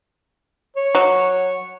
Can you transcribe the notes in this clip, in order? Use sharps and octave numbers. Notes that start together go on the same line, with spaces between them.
C#5
F#3